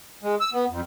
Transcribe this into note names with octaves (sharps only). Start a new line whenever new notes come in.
G#3
E6
B3
F2